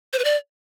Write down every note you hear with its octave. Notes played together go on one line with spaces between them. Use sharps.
C5
B4
D5